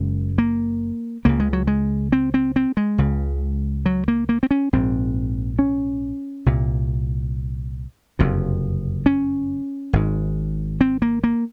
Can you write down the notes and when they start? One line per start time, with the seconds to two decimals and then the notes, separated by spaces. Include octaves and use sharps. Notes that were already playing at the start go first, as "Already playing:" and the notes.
Already playing: F#1 F#2 C#3 G#3
0.38 A#3
1.25 C#2 C#3 A#3
1.40 G#3
1.53 F#3
1.67 G#3
2.12 C4
2.34 C4
2.56 C4
2.77 G#3
2.98 C#2 C#3
3.86 F#3
4.08 A#3
4.29 A#3
4.43 C4
4.51 C#4
4.73 A#1 G#2 C4
5.59 C#4
6.46 C2 A#2
8.19 F#1 F2 C3
9.06 C#4
9.93 G#1 G#2
10.81 C4
11.02 A#3
11.24 A#3